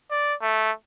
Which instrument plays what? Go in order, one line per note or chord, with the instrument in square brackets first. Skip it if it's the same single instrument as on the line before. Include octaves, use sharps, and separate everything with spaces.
[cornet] D5
A3